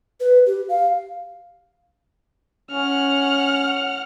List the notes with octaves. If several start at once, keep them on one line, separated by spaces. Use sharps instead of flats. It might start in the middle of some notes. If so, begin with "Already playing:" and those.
B4
G4
F5
C#4 F#5 F6